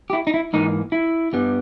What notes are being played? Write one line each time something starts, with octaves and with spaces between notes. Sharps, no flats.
G4
E4
D#4
E4
G#2 E3 A#3 D#4
E4
G2 G3 B3